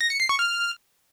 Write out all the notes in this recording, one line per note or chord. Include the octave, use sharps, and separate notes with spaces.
A#6
C#7
C7
C#6
F6